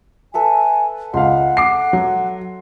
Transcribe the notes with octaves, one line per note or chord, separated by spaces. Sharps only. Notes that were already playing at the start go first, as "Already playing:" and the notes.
A4 B4 E5 G#5
C#2 F5 F#5 C6
D6 C7
F#3